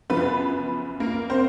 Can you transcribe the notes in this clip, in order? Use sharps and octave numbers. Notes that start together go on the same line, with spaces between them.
F#2 C#3 F3 B3 B4
A#3 A#4
C4 C5